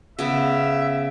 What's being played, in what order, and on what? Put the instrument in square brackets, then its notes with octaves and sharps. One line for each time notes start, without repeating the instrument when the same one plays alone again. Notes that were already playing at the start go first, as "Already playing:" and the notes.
[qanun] C#3 B3 [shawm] E5